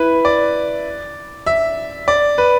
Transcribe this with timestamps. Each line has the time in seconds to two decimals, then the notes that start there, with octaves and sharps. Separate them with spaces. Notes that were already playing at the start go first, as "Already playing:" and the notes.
Already playing: E4 B4
0.25 D5
1.46 E5
2.08 D5
2.38 B4